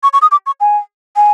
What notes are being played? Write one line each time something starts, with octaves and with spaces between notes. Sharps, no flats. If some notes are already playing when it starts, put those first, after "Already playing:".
C#6
C#6
D#6
D6
C#6
G#5
G#5